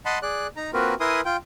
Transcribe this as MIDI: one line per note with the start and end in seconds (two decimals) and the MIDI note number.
0.06 0.19 75
0.06 0.19 78
0.06 0.19 81
0.06 0.19 83
0.06 0.19 84
0.22 0.47 68
0.22 0.47 74
0.22 0.47 90
0.56 0.71 63
0.56 0.71 82
0.73 0.94 58
0.73 0.94 60
0.73 0.94 65
0.73 0.94 66
0.73 0.94 70
0.73 0.94 71
1.00 1.21 64
1.00 1.21 70
1.00 1.21 71
1.00 1.21 80
1.00 1.21 84
1.00 1.21 87
1.25 1.37 65
1.25 1.37 79